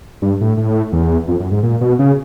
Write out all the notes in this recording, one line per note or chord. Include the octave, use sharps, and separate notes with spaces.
G2
A2
A2
E2
F2
F#2
G#2
A#2
B2
C#3